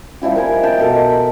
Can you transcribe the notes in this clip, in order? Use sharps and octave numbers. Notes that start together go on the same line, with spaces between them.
F3 G3 E4 G4
A#4 D#5 G#5
D#5 G5 A5
B2 A4 A#4
B5